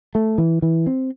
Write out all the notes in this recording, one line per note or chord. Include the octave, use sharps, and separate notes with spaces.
A3
E3
E3
C4